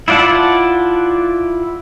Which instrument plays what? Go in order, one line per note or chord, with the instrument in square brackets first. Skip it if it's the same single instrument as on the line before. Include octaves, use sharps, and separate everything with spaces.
[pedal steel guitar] E4 F4 D5 F#5 A5